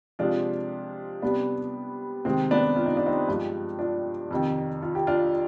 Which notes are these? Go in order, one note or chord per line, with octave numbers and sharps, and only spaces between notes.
C3 F3 G#3 D4 F4
C3 G3 B3 D4
C3 D#3 G#3 C4
B3 D4
F4
D#4
D4
C4 D#4
G2 F3 G#3
D4 F4
F2 C3 D#3
F4
G4
D4 F4